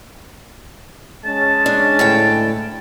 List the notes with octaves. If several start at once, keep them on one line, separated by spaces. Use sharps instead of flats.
G#3 C#4 A5
D4
D2 A2 G5